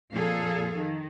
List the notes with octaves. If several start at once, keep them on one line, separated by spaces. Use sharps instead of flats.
F2 A#2 G#4 A4 F5
D#3